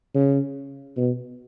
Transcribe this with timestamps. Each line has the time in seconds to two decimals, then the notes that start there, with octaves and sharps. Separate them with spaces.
0.15 C#3
0.97 B2